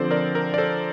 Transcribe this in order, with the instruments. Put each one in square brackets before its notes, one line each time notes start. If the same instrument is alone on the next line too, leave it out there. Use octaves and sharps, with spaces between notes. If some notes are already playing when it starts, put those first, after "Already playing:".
Already playing: [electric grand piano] D3 F3 C4 A4 C5 D5
A#4 D5
A#4
D5
A4 C5